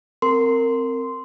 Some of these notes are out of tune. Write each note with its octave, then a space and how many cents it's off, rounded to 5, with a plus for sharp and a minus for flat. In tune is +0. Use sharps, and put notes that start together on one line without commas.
C4 +0 A#4 -20 C6 -10